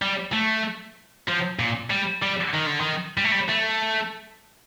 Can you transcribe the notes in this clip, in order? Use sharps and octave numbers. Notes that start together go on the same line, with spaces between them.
G3
A3
F3
A#2
G3
G3
D#3
D3
D#3
G3
A3
G3
A3